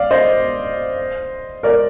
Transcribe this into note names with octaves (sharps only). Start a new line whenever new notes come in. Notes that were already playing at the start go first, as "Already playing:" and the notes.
Already playing: D5 F5
C5 D#5
A#4 D5